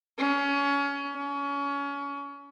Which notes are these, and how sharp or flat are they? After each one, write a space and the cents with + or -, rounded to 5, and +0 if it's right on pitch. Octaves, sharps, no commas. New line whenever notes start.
C#4 +25
C#4 +30